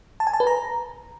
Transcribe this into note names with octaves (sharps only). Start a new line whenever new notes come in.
A5
G#5
A5
B4
A#5